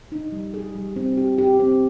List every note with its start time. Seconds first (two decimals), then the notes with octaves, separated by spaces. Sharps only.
0.12 D#4
0.32 G3
0.54 G#4
0.75 G3
0.96 C4
1.17 G4
1.38 G4
1.60 C4